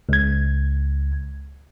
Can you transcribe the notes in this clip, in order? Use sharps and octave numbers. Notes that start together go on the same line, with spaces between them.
C#2 G#6